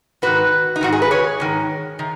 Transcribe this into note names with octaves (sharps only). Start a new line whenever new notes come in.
G#2 D#3 F#4 B4
D#4
G#2 D#3 F#4
G#4
B4
G#4 C#5
G#2 D#3
D#3